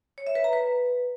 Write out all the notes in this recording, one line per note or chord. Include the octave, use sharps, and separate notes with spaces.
C#5
E5
B4
A#5
B4